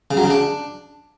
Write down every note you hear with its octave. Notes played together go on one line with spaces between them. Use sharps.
C#3
F#3
C#3
D4